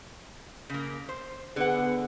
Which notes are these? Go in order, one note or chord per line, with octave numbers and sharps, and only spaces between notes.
C#3 A#3
C5
D3 B3 G#4 F#5